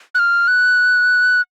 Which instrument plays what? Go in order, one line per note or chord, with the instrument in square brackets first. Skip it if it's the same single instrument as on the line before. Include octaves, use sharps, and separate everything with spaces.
[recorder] F#6
F6
F#6